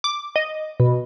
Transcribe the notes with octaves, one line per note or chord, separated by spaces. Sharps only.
D6
D#5
B2